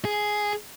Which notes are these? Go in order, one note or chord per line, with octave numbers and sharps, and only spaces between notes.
G#4